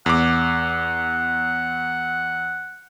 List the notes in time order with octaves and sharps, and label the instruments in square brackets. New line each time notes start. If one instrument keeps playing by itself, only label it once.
[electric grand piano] E2 D6 [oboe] F#5